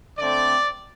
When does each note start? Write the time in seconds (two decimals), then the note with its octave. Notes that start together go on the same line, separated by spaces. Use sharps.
0.18 D3 A3 C4 D5